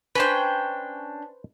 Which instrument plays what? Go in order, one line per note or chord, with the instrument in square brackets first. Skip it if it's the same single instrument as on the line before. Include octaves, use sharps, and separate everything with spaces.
[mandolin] C#4 D4 G5 [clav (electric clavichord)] B4 C5